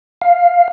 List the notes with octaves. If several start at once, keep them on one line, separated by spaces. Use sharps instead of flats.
F5